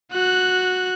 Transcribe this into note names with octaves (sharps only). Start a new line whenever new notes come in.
F#4 F#6